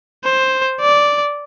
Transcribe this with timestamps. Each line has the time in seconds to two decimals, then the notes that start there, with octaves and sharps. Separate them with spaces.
0.24 C5
0.81 D5